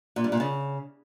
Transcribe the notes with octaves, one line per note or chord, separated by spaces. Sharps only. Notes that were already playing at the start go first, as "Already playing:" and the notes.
A#2
G2
A#2
C#3